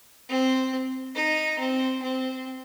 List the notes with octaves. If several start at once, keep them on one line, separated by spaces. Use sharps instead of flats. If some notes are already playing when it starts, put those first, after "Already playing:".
C4
D#4
C4
C4